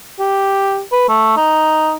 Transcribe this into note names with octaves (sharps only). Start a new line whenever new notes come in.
G4
B4
A3
D#4